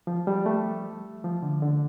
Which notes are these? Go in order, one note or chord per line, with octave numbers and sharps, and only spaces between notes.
F3
G3
A3
F3
D3
D3